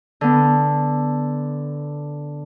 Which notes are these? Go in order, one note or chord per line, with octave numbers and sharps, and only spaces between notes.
D3 B3